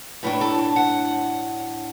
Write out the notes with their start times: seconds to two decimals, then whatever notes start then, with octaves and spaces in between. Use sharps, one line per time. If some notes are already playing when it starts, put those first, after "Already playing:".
0.23 A2 F#3 D4 B4
0.41 A4
0.58 A5
0.76 F#5